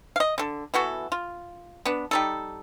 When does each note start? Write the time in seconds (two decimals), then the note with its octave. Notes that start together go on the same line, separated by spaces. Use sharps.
0.16 D#5 F5
0.38 D3 A4
0.74 E3 B3 F#4 A4
1.12 F4
1.85 B3 D4
2.11 G3 D#4 A4